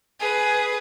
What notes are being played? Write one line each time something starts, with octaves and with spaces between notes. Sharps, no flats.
G#4 B4